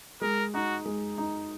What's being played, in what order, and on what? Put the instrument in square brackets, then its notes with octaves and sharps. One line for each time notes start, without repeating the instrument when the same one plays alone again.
[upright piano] G#3 [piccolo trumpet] A#4
[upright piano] D#4 [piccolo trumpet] F#4
[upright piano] G#3
D#4